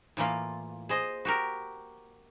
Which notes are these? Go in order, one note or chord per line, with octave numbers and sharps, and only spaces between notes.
A2 E3 A#3 F4
G#4 C5 D#5
F#4 G4 A#4